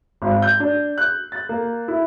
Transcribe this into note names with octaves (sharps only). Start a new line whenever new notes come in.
G#1
G6
D4
F#6
A6
A#3
E4